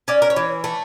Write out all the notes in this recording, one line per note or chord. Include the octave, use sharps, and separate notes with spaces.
C#4 D5
A#4
C#5
E3
A3